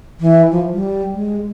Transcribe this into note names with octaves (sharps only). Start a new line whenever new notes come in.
E3
F3
G3
G#3